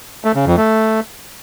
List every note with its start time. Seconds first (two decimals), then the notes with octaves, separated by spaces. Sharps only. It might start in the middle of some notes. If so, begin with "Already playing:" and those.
0.25 A3
0.35 C#3
0.46 F2
0.57 A3